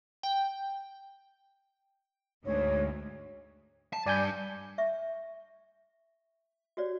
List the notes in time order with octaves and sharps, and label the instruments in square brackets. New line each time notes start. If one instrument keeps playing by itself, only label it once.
[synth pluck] G5
[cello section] D2 G#2 [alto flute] C#5
[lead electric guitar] A5
[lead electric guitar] G2 [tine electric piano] D5 G#5 G6
[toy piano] E5 C#6
F#4 G4 C#5 D5